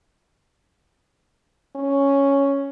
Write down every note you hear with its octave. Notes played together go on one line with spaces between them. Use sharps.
C#4